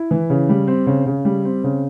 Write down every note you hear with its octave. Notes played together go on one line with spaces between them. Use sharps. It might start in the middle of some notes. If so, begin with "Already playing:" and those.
Already playing: E4
E3
C#3
G3
C4
C#3
C#3
G3
C4
C#3